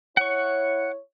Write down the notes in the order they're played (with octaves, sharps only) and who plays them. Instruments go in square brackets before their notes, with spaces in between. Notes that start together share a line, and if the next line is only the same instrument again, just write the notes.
[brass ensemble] E4 C#5 [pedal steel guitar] F#5 C#6